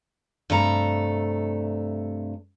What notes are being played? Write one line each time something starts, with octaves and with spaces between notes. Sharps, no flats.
G2 C3 A3 A4 A#5